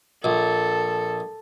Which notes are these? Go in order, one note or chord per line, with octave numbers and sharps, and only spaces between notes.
A#1 A4